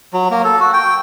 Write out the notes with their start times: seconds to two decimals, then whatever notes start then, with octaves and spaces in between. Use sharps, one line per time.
0.13 F#3
0.31 A#3
0.44 A4
0.60 F#4
0.73 G5